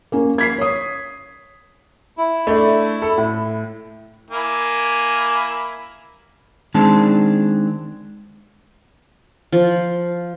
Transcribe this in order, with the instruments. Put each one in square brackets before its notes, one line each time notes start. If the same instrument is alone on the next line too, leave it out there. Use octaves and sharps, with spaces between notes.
[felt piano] A#3 C#4
G#6 B6 C7
C#5 D#6
[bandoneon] E4
[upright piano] A3 D4
A4
A2
[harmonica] A#3 E4 G#5
[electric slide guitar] D#3 G#3 C4 D4 A5
[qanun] F3